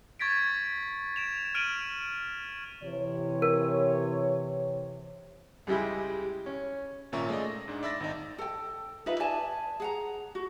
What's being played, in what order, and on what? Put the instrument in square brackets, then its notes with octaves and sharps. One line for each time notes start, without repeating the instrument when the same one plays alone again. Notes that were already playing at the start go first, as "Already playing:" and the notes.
[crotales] C#6 G#6 A6 B6 D7
D7 E7 F7
F6 D7 D#7 F7 F#7
[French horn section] C3 E3 C#5
[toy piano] A#4
[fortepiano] C#2 G3 G#3 E4 G4
C#4
[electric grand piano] G#1 A#2 C#4 E5 A#5 C#6
G#3 A3 D5 D#5
A#6
G#2 D4
D5 E5 B5 E6 A6 A#6
G#1 D#4
[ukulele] A4 G5
D#4 F4 B4 E5
D5 E5 G#5 A5
G#4 F#5 A#5
F#4